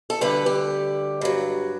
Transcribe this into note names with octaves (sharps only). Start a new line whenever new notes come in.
A4
D2 D3 G3 B4
G4
G2 F#3